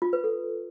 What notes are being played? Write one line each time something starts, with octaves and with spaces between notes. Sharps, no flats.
F4
B4
A4